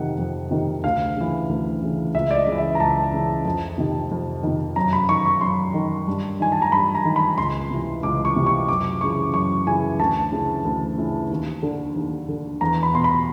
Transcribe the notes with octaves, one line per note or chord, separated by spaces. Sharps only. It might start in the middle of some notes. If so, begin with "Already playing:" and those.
Already playing: F2 C3 D#3 F#5
F2
C3 D#3
D2 F5
C#3 E3
D2
C#3 E3
C#2 E5
D5
D#5
C#3 E3
E5
A#5
C#2 A5
C#3 E3
F2
C3 D#3
F2
C3 D#3
F#2 A#5
B5
D#3 C#6
C#6
F#2 C6
D#3
G2
D#3 G#5
A5
A#5
G2 B5
A#5
D#3
B5
C#2 C6
C3 E3
C#2 D6
C#6
C3 E3
C#6
F#2 D6
C#3 E3 C#6
F#2 C#6
C#3 E3 G#5
D2 A5
C#3 E3
D2
C#3 E3
D#2
D3
D#2
D3
E2 A#5
B5
B2 C6
B5